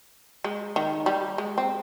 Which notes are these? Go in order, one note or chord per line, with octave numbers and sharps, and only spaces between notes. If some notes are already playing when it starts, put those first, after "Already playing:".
G#3
D#3
G3
G#3
C4